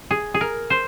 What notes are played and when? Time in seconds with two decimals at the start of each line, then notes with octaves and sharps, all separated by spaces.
0.11 G#4
0.34 G#4
0.41 A#4
0.70 C5